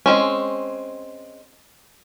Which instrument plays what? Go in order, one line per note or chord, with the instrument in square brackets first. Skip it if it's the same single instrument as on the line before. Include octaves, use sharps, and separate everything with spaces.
[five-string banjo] G#3 C4 C#4